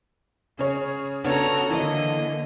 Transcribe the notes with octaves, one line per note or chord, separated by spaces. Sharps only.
C#3 G#4 C#5
C#3 B3 D4 F#4 A4 C#5 A#5
D3 E3 A#3 D#5